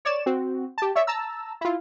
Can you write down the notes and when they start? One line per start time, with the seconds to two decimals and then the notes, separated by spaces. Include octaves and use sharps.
0.05 C#5 D5 E7
0.26 C4 F#4
0.78 G4 A5
0.95 C#5 D5 E5
1.07 A5 A#5 E6
1.61 E4 F4